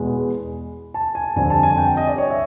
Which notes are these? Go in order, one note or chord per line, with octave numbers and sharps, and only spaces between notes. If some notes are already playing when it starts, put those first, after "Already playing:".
Already playing: E2 B2 G#3 B3
A5
G#5
F2 D3 G3 C4 G#5
A5
G#5
G5
D#5
D5
C#5
E5